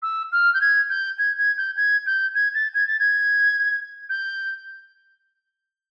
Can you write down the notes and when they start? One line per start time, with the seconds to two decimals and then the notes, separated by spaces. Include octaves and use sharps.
0.02 E6
0.32 F6
0.54 G6
0.61 G#6
0.90 G6
1.18 G#6
1.38 G#6
1.58 G6
1.77 G#6
2.06 G6
2.35 G#6
2.54 A6
2.74 G#6
2.87 A6
2.99 G#6
4.10 G6